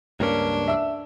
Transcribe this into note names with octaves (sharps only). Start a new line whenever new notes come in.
C#2 G2 A#3 C#4 D4
E5 E6